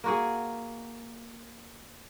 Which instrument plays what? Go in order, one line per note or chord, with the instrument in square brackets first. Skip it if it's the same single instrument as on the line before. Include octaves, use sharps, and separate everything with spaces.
[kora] A#3 F#4 G#4